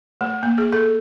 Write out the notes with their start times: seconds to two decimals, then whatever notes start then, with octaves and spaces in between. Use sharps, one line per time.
0.21 A3
0.43 A#3
0.58 G#4
0.72 A4